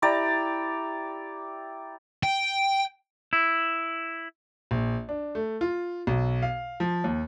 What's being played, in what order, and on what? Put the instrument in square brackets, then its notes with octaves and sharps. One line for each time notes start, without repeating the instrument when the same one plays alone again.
[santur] E4 G4 D5 A#5
[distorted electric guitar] G5
[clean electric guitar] E4
[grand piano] A#1
D4
A3
F4
B1
F5
F3
D#2